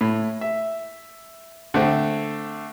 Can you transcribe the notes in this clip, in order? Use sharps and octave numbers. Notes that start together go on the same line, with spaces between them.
A2
E5
D3 A3 C4